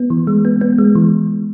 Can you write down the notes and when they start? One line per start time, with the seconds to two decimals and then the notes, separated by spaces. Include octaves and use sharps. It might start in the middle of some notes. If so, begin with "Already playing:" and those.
Already playing: B3
0.10 E3
0.27 G#3
0.45 B3
0.61 B3
0.78 G#3
0.95 E3